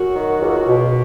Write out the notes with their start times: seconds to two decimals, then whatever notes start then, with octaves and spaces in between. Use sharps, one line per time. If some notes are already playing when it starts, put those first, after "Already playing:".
Already playing: F#2 F#4
0.15 D#3
0.41 C#2
0.67 B2